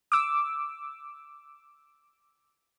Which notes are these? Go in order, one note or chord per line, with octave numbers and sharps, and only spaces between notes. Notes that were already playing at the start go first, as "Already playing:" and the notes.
D6 E6